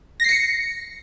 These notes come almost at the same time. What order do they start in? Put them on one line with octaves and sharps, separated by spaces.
A#6 C7 C#7